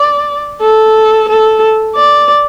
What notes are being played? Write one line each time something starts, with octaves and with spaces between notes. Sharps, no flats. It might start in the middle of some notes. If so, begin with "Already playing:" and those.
Already playing: D5
A4
A4
D5